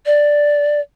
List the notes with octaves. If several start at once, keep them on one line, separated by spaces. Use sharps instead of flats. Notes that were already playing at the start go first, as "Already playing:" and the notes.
D5